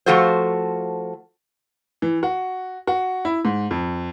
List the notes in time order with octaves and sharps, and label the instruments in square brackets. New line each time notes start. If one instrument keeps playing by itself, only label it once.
[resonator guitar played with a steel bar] F3 A3 F4 F#4 A4 C5
[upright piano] E3
F#4
F#4
E4
G#2
F2